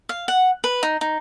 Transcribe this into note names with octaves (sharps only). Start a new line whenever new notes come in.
F5
F#5
B4
D#4
D#4